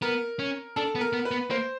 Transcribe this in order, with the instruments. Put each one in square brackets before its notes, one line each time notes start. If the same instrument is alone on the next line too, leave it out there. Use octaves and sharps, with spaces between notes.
[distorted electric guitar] B3 [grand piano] A#4
[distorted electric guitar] C#4
[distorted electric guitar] D4 [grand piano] A4
[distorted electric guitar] B3
[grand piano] A#4
[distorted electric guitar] B3
[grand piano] B4
[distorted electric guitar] B3
[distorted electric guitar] A#3 [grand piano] C5